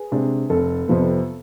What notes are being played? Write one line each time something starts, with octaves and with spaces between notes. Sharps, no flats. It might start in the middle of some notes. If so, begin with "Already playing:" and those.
Already playing: G#4 B4
C3 G#3 D4
F1 A4
F2 C3 F3 B3